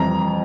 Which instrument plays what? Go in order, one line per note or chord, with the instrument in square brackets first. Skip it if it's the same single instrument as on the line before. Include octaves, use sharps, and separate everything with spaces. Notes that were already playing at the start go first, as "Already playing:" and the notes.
Already playing: [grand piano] F2 E3 G3 A#5